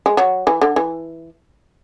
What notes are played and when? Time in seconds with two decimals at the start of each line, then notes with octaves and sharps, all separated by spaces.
0.06 G#3
0.17 F#3
0.47 E3
0.61 D3
0.76 E3